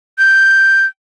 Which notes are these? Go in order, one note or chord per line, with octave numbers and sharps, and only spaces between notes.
G6